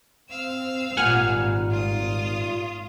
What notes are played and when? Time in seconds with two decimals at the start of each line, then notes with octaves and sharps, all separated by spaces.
0.30 C4 F5 E6
0.97 G#1 A#2 G3 F#5 G#5 F6
1.71 F4 D#6